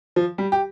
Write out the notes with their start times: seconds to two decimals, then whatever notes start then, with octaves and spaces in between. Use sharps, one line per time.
0.16 F3
0.38 G3
0.52 G4